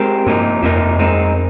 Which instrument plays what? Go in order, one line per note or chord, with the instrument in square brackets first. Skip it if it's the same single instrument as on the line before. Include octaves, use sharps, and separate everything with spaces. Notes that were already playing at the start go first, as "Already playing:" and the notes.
Already playing: [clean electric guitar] G#3 C4 G4 A#4
[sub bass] G2 [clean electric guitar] C3 F3 A#3 D#4 A#4
[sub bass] F2 [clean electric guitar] C3 F3 A#3 D#4 A#4
[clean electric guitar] G#3 C4 D#4 A#4